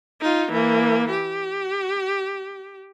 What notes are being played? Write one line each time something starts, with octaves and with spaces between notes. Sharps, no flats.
D#4 F4
E3 A#3
G4